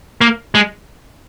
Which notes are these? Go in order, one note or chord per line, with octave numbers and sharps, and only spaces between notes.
A#3
G#3